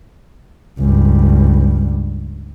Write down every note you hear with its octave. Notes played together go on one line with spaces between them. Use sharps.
C#2 G2